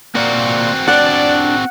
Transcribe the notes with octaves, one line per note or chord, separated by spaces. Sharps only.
A#3 C4 F#4 D5 F5
D4 D5 F#5